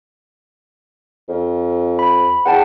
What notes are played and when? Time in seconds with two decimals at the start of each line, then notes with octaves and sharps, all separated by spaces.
1.29 F2
1.99 B5
2.46 E2 F#5 G5 A5